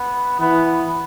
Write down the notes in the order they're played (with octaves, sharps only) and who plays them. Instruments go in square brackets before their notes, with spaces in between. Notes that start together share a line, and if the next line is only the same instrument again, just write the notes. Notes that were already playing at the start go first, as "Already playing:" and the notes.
Already playing: [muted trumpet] B3
[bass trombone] E3 [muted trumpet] B3